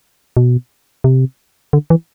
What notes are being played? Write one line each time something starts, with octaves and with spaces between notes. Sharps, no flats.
B2
C3
D3
E3